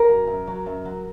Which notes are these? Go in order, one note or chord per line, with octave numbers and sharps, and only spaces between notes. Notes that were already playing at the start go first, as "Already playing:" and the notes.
Already playing: A#4
F#2
F#2
F#3
F#2
F#3